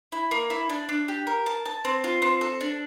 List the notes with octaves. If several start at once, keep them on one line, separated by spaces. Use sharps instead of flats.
E4
A#3
E4
D4
D4
G4
A#4
A5
A5
C4
F4
C4
A4
D4